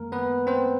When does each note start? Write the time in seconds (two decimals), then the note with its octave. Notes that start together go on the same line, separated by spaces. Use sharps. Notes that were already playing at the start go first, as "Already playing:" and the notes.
Already playing: F#2 D#3 G#3 A#3 A#4
0.12 B3 B4
0.47 C4 C5